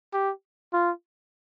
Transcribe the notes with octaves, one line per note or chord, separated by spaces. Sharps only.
G4
F4